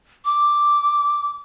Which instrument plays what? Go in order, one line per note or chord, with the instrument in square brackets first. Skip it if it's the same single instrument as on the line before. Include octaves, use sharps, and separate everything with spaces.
[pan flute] D6